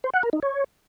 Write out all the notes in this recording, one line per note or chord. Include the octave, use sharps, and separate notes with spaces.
C5
F#5
A#4
D#4
C#5